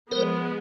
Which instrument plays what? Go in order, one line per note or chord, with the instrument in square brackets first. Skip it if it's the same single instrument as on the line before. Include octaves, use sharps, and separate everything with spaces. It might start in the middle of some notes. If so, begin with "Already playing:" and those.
[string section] F3 G#3 B3 [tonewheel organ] A#4 C5